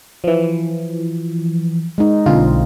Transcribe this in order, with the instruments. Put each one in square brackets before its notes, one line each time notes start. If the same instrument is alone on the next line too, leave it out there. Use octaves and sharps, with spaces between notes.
[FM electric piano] E3 F3
[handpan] G#3 D#4
[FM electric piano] B1 F4 [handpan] D3 C4